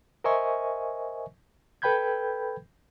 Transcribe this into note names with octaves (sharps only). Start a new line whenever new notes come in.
A#4 C5 D#5 E5 G#5 C#6
A4 B4 G5 B5 G6 G#6